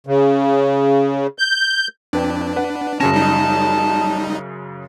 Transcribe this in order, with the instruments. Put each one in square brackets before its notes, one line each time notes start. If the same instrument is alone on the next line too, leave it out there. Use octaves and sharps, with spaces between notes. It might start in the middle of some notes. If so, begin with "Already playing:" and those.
[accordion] C#3
G6
[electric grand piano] F2 B4 G5 [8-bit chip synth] D4
[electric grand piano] B4 F#5
[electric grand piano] F#2 C#3 A#6 [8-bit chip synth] C#4 [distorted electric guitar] A5
[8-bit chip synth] G3 D#4